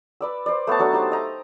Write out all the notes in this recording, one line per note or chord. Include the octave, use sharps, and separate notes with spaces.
B4 D5 E6
C5 D5
A3 B3 C#5 A5
F#3 D4 A4 D6
D#4 G4 C5
D#5 A#5